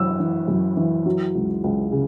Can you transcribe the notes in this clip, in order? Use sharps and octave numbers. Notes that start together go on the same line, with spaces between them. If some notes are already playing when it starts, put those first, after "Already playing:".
Already playing: F#2 E3 E6
E3
F#2
E3
F#3
C#2
C#2
C#3